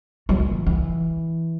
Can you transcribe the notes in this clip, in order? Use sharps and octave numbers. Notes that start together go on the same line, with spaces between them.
F#3
E3
E3